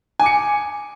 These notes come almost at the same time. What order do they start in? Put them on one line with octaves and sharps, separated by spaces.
G#5 D6 C#7